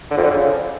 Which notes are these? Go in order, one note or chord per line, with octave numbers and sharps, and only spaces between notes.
D3
F2
D3
C#3